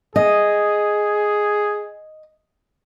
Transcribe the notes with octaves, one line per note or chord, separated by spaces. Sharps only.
G#4 D#5